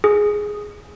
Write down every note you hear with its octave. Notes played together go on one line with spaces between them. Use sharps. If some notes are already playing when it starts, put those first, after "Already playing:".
G#4